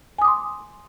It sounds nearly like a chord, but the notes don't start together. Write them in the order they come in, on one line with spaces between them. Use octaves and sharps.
G#5 D#6 D6 C6